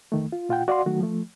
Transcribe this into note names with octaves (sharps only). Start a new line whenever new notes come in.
F2 D#3 A3
F4
A#2 F4 F#5 G5
F#4 D5 F5 F#5 C6
D#3 F#3 A3 F#4
F3 A3